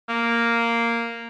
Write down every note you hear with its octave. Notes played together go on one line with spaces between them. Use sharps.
A#3